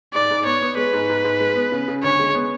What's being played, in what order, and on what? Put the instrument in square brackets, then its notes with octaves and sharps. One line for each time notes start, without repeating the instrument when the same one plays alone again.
[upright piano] G#2 [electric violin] D5
[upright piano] G#2
[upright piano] B3 [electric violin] C#5
[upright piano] B3
[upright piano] G#3 [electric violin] B4
[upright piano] G#2
G#2
G#2
G#3
B3
C#3
C#3
[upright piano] D2 [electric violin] C#5
[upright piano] G#3
B3